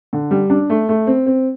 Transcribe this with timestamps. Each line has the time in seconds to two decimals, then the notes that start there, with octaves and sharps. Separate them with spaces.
0.13 D3
0.31 G3
0.50 D4
0.70 A3
0.89 A3
1.07 C4
1.26 C4